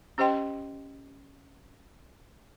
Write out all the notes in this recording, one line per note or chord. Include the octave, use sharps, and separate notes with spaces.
C#4 G4 C5 D#5 G5 C6